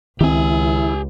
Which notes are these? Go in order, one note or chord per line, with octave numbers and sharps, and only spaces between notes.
C#2 D#3 C4 E4 G4 G#5